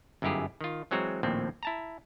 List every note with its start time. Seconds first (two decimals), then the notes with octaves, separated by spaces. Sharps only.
0.22 G1 F#2 D#4 E4 G4 G#4
0.61 D#3 F4
0.91 E3 F#3 G#3 C4 F#4 A#5
1.23 A#1 D#2 A2 F3 C4
1.63 E4 A5 A#5